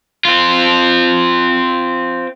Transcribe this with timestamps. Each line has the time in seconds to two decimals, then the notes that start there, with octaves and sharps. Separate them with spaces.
0.25 C4 F4